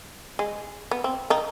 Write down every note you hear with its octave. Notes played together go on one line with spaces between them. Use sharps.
G#3
B3
C4
D#3 D#4